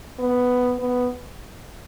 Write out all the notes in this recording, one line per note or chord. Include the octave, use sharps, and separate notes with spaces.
B3
B3